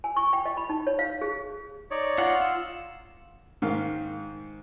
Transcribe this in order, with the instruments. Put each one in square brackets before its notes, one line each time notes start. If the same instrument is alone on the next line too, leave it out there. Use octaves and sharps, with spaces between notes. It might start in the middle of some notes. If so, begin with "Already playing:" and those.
[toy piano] G#5
C#6
G5
D#5
B5
D#4
C#5
F5
G#4
[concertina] D#4 C#5 D5
[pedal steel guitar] F4 F#5
[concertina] E6
[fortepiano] G#2 D#3 F5